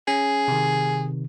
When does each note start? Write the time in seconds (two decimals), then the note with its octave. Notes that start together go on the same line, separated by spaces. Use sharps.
0.08 C#4 G#4
0.48 C3 D#3